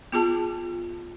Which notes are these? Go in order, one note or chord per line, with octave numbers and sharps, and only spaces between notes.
B3 F4 G#4 A5